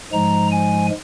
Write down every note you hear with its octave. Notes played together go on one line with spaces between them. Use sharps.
G#2 F3 G#3 A#5
G#5